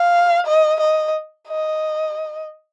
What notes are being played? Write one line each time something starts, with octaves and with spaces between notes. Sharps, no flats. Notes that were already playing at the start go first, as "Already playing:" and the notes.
Already playing: F5
D#5
D#5
D#5